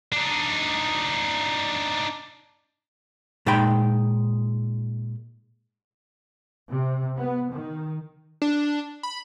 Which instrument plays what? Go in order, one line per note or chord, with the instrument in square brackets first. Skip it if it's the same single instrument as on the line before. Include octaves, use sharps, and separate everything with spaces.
[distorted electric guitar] D4 D#4
[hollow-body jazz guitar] A#2 G#3 D#4 G5 B5
[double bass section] C3
B3
D#3
[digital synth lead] D4
B5